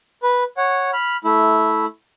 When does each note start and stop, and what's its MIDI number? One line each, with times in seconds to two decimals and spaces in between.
0.23 0.44 71
0.57 0.91 73
0.57 0.91 78
0.93 1.17 83
0.93 1.17 89
1.24 1.85 57
1.24 1.85 64